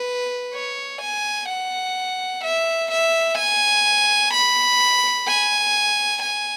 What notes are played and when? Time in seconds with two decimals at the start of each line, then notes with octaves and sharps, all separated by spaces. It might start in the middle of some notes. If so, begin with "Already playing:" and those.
Already playing: B4
0.54 C#5
1.02 G#5
1.49 F#5
2.44 E5
2.91 E5
3.38 G#5
4.33 B5
5.27 G#5
6.22 G#5